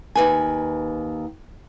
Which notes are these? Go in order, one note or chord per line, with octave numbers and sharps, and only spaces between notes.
D#2 B4 G#5